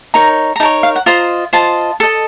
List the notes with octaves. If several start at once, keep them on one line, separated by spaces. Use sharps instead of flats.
D#4 A#4 C#5 A#5
A#5
D#4 A#4 C#5 A5
F5
F#5
F4 C5 D#5 A#5
F4 C5 D#5 A5
A4 D#5